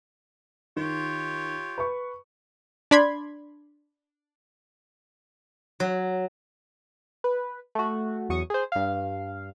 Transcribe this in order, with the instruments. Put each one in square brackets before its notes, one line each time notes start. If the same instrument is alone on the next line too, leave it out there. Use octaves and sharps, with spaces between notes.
[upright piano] D#3 [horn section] F4 G4 C#5
[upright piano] B4 C#6
[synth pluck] D4 D5 B5 C6 G#6
[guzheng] F#3
[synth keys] B4
A3 F#4
E2 F#3 C#6 D#6
G#4 C5
G2 F5